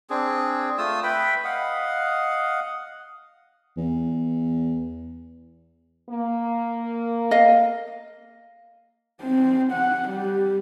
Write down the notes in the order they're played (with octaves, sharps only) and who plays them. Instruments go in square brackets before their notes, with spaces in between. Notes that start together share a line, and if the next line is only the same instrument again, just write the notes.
[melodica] C4 D4 G#4
A3 F4 D#6 E6
B4 E5 G5 B5
D#5 F5 F#5
[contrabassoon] E2
[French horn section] A#3
[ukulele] D#5 F5
[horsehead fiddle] C4
F#5
G3